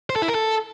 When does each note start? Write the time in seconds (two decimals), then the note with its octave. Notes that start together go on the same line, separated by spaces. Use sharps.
0.10 C5
0.16 A4
0.22 E4
0.28 A#4
0.35 A4